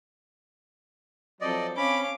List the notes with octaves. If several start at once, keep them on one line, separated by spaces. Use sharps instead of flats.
F3 F#3 C4 A4 D5 D#5
C4 C#4 F5 B5 D6